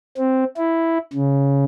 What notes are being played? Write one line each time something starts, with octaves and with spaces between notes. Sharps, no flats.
C4
E4
C#3